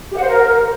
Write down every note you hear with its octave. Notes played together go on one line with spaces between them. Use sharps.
G4
F#5
C5
A#4